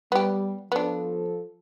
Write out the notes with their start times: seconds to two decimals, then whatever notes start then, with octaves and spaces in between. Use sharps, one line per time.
0.12 G3 B3 G4
0.72 F3 B3 D4 A4